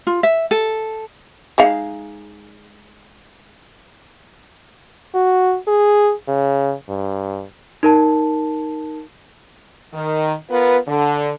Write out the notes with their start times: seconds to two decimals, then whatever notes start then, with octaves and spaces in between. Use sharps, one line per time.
0.07 F4
0.23 E5
0.51 A4
1.58 G#3 D#4 F5
5.15 F#4
5.67 G#4
6.28 C#3
6.89 G2
7.83 D#4 A#4 A5
9.94 D#3
10.50 B3 F4 A#4 B4
10.88 D3